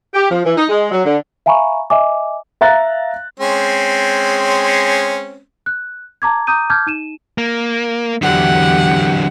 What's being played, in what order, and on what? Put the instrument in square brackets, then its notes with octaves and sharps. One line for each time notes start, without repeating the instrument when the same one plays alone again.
[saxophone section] G4
F3
E3
D#4
G#3
F#3
D3
[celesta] E5 F5 G#5 A#5 B5 C#6
D#5 E5 G#5 D6
[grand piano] E5 F5 A#5 F#6 A6
[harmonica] G#3 C4 C#4
[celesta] F#6
A5 A#5 D6 G#6
A#5 D6 D#6 G6 D#7
A5 D6 F6 G6 G#6
D#4 D#7 E7
[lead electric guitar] A#3
[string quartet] E2 G4 F#5 [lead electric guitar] D3 F#3